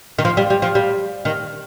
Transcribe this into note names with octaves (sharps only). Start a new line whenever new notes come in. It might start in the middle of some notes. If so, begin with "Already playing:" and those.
D#3
F3
G3
G3
F3
G3
D#3